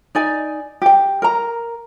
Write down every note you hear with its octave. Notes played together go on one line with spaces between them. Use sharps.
D#4 D5 G#5
G4 G5
A#4 A#5